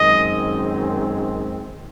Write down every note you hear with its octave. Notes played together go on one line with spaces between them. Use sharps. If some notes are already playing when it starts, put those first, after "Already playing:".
Already playing: F#2 D#3 G#3 C4 D#5